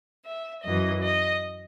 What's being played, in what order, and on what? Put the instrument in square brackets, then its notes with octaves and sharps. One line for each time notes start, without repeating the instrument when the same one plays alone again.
[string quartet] E5
F#2 E3 D#5
D#5